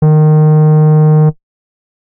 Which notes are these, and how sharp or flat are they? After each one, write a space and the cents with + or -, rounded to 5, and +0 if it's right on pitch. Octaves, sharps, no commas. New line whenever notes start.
D#3 -20